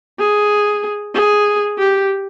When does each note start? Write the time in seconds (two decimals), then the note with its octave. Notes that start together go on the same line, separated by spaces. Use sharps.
0.19 G#4
1.14 G#4
1.78 G4